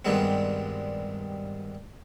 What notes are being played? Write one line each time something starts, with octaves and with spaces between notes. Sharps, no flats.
G2 D#3 G3 G#3 B3 C4